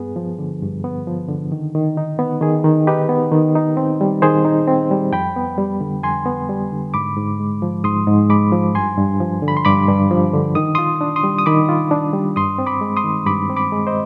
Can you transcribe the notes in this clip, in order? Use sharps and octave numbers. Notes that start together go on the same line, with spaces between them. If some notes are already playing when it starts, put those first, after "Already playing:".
Already playing: G2 B3 G#4
F3
D3
G2
B3
F3
D3
D#3
D#3
D#4
B3
D#3 G#4
D#3
D#4 G4 B4
B3
D#3
D#4
C4
G3
D#3 G#4 C5
D#4
C4
G3
F2 G5 B5
B3
G3
D3
F2 G#5 C6
B3
G3
D3
G#2 B5 D6
G#2
G#3
F3
G#2 C6 D#6
G#2
G#3 B5 D6
F3
G2 G#5 C6
G2
F3
D3
B5
C6
G2 B5 D6
G2
F3
D3
D#3 D#6
C6 D#6
F4
D4
C6 D#6
G3
D#6
D#3 B5 D6
F4
D4
G3
G2 C6 D#6
C4
B5 D6
G#3
C6 D#6
D#3
G2 B5 D6
C4
B5 D6
G#3
C5 D#5